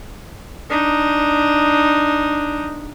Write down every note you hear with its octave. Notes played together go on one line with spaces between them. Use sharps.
D4 D#4